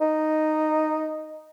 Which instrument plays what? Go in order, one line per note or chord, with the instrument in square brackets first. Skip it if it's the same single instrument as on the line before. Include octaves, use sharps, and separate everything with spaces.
[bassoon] D#4